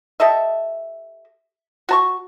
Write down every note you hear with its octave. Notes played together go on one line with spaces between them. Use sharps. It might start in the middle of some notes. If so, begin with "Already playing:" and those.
G4 A4 D#5 E5
F#4 A5 C#6